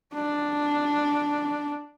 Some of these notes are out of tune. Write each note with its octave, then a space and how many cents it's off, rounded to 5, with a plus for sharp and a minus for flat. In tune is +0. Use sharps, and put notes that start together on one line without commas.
D4 +0